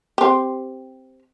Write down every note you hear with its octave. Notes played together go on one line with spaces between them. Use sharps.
C4 G4